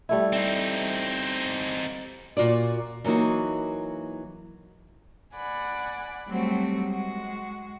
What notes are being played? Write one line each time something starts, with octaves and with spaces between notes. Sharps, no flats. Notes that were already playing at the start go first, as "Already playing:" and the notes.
G3 A3 E4
C4 D#4
A#2 F4 F#4 D5
E3 F#3 A#3 D#4 F#4
D5 F#5 G#5 B5
F#3 G3 A3 C4 F#4
G#3 F#4